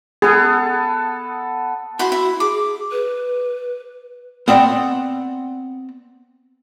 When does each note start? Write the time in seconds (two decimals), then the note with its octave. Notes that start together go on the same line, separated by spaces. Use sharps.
0.22 B3 G#4 A4
1.99 E4 F#4 F#5 C6
2.12 E4
2.40 G#4 D6
2.92 B4
4.48 B3 C4 D5 E5 F#5 G5